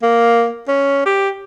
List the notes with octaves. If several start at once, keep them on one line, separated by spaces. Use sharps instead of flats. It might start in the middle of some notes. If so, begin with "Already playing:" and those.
A#3
C#4
G4